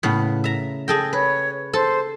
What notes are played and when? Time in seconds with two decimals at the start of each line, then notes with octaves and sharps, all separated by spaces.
0.03 A2 C#3 B3
0.44 E5 A#5
0.88 G#4 A4 G5 A#6
1.13 B4 C#5
1.73 A4 C5